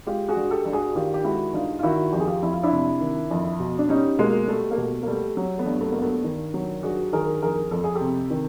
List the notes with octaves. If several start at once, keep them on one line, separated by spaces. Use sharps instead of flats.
G#3 F4 G4
F#4 G#4
G2
G4 A4
G2
F#4 G#4
D#3 F4 G4
G4
G#3 E4 F#4
G2 D#4 F4
F4
D#3 E4 F#4
F2 G4
G#4
F4 G4
F2 E4
F4
D4 E4
C3
D#3
F2
B2
D4
G3 C#4 D#4
B2 G#3 A#3
G3 A3
A#3
B2 A3
A#3
G3 A3
F#3
A3 B3
G2
A3 B3
G2 A#3
A3 B3
D#3
F#3
G2 F#4 G#4
D#3 G#4 A#4
F2 G#4 A#4
F2 A4
G#4
G4 A4
C3
D#3